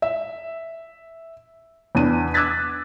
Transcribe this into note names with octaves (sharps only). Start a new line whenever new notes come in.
E5
E2 D4 D#7
D6 E6 F#6 G#6 A6 B6